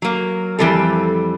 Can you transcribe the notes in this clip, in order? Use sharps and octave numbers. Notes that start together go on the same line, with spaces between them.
F#3 A#3
F2 E3 G3 C4 A4